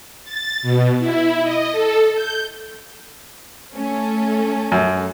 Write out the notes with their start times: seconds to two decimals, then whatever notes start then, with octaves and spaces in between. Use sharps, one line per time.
0.25 A6
0.62 B2
0.99 E4
1.42 D#5
1.72 A4
2.14 G6
3.76 A3 C#4 A4
4.72 F#2